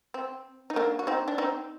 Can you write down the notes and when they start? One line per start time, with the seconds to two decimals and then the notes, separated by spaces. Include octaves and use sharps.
0.14 C4
0.70 D#4
0.76 A#3 D4
0.99 F#4
1.07 C4 D#4
1.28 D4
1.38 C4 D#4